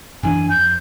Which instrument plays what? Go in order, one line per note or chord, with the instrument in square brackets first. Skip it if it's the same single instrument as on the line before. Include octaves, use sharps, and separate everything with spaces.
[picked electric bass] F#2 E3 D4 [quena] G#5
[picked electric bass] F2 [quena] G6